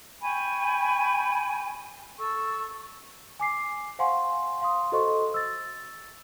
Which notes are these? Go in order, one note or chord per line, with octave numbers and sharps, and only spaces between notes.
G5 G#5 B5 C#6
A4 C#6 E6
G#5 D6 C7
C5 F5 F#5 G#5 C6 C#6
F5 C6 D#6
F#4 A4 C5 D#5 C6 C#6
E6 A6